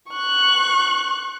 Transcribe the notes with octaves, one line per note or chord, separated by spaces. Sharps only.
C#6 F#6